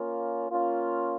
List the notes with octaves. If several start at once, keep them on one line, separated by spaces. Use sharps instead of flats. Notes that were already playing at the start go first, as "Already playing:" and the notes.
Already playing: A#3 C#4 F4
A#3 C#4 F4